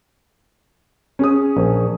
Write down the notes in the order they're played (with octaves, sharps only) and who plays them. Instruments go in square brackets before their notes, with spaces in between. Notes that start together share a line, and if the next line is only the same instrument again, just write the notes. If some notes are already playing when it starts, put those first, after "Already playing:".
[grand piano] C#4 G#4 D#6
[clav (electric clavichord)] A#1